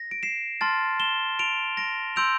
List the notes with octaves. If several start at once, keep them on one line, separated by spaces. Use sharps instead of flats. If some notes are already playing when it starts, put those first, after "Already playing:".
Already playing: A#6
D7
C7 E7
A5 C6 F6 A6
E7 G7
D7 F7
A#6 D7
C6 E6 G6 D7 F7